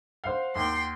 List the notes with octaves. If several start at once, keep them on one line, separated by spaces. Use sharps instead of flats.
C5 F5 F#5
D#2 G5 C6